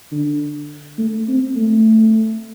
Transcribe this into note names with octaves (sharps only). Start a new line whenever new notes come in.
D3
A3
C4
A3